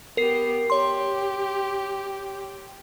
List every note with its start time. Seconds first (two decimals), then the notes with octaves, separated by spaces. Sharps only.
0.17 B3 G4 A#4 C7
0.70 G4 C#5 C6